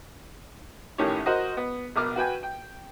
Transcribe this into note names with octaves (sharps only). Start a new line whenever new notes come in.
A#1 A2 D#3 C#4 G4 C#5
F#4 A#4 C5 D#5
B3
A#1 B2 A#4 D6 F6
F#4 B4 G5 G#5
G5